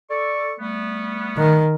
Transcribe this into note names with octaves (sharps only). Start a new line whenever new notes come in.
A4 D5 C#6
G3 A3 B3
D#3